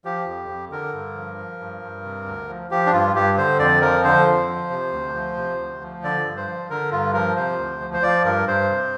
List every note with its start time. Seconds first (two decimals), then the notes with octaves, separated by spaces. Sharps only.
0.05 F3 G4
0.27 F2
0.49 F2
0.71 D3 A#4
0.93 G2
1.15 F3
1.38 F3
1.60 G2
1.82 G2
2.04 C3
2.26 D2
2.48 F3
2.71 F3 G4
2.86 D4
2.92 G2 F4
3.15 G2 G4
3.37 D3 C5
3.59 F2 D5
3.81 F3 A#4
4.04 D3 C5
4.27 F2
4.48 F3
4.70 C3
4.92 D2
5.14 F3
5.37 C3
5.59 D2
5.81 F3
6.03 D3 D5
6.25 G2
6.37 C5
6.47 F3
6.70 D3 A#4
6.92 G2 F4
7.14 F3 A#4
7.36 C3 C5
7.58 D2
7.81 F3
7.94 C5
8.03 F3 D5
8.25 G2 A#4
8.47 G2 C5
8.70 C3